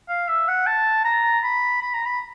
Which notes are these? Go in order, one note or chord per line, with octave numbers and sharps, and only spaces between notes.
F5
E5
F#5
A5
A#5
B5
B5
A#5
B5